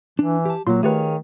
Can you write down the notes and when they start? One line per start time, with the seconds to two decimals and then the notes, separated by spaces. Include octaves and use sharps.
0.19 E3 D4
0.45 G4 A5
0.67 A#2 F#3 A#3 F4 C6
0.83 D#3 A3 G4 G#4 B4 C#5 F5